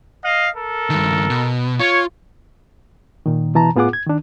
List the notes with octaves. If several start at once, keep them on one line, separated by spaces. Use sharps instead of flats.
D#5 F5
A4 A#4
G2 D#3
B2
F4 C#5
A#2 D#3
B2 E3 A5 A#5
A2 B3 F4 G#4 F#5 D6
G#6
D#3 D4